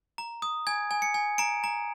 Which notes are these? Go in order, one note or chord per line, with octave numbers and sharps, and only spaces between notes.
A#5
D#6
G#5 G#6
G#5
C#7
G#5
A#5 D7
A#5